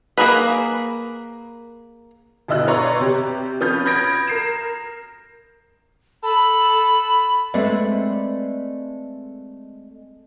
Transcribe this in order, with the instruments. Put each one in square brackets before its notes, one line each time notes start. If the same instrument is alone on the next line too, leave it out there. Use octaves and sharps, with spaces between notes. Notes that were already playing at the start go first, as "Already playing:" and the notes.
[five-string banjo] A#3 B3 G#4 A#4 B4
[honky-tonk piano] G1 B2 E4 D#5 E6 F#6
B4 C#5 D5 A#5 C6 C#6
C3 G4
F3 C#4 B4 D#6 F6 G6
B5 G6 G#6 A#6 D7
A#4 C7 E7
[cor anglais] A4 [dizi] B5
[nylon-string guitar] G#3 A3 C4 B4 D5 E5